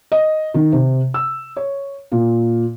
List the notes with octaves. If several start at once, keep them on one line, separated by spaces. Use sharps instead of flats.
D#5
D#3
C3
E6
C#5
A#2